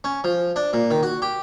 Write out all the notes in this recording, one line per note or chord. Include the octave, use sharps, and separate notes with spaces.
C#4
F3
D4
A#2
D#3
F#4
G4